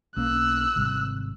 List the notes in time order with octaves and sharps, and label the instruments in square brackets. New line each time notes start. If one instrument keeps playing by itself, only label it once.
[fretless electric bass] B1 A#3 C#4 [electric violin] E6 F#6
[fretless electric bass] G#1 C3 G3